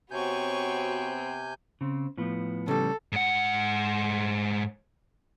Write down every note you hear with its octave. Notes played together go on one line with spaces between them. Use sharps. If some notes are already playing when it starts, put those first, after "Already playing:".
C3 B3 C4 F#4 C#5 G#5 C#6 G6
C#3 C4
A2 F3 B3
C#3 G3 A4
G#2 F#5